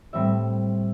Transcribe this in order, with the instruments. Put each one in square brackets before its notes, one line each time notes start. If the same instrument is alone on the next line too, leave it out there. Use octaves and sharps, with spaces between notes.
[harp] A2 G3 C4 E5